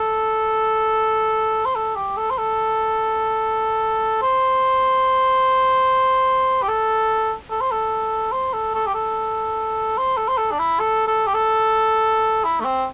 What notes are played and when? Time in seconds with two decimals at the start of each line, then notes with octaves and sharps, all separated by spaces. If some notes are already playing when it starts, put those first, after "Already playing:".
Already playing: A4
1.66 C5
1.76 A4
1.96 G4
2.17 A4
2.30 C5
2.38 A4
4.22 C5
6.62 G4
6.68 A4
7.50 A4
7.61 C5
7.72 A4
8.32 C5
8.53 A4
8.74 A4
8.87 G4
8.95 A4
9.98 C5
10.17 A4
10.28 C5
10.38 A4
10.51 D4
10.59 E4
10.80 A4
11.07 A4
11.27 G4
11.34 A4
12.44 E4
12.61 A3
12.65 C4